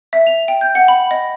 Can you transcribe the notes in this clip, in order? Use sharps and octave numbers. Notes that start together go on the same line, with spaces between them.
E5
F7
G5
G6
F#5
B5
D#5